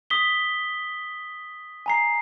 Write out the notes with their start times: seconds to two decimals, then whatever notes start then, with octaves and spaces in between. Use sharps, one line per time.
0.10 D#6 B6 G7
1.86 G#5 A#5 C7